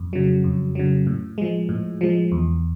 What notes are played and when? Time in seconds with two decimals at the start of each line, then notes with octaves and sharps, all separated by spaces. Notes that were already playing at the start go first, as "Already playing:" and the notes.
Already playing: F2
0.13 C#3 F#3
0.44 F2
0.75 C#3 F#3
1.07 A2
1.38 F3 G#3
1.69 A2
2.01 F3 G#3
2.32 E2